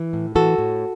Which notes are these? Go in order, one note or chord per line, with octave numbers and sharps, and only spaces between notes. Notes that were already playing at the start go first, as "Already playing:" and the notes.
Already playing: E3
A2
E3 F#4 A4
A2